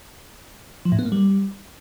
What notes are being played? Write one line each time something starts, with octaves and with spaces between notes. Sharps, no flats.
F3
A2
B3
A#3
G3